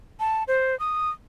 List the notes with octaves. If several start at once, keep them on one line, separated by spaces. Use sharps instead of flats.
A5
C5
D#6